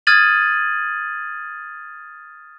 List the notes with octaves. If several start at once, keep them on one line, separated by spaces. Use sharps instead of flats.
D#6 F6 G#6 A6 D#7 F#7